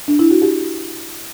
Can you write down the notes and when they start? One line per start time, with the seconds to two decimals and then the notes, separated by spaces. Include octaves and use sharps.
0.08 D4
0.19 E4
0.30 F#4
0.42 G4